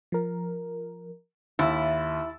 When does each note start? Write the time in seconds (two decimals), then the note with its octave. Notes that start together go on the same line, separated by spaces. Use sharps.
0.12 F3 A#4
1.59 D#2 E4 E5 E6 A6